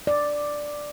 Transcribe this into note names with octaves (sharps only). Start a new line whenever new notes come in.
D5